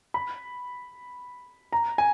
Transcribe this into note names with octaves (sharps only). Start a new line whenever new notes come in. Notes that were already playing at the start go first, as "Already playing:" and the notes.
B5
A#5
G#5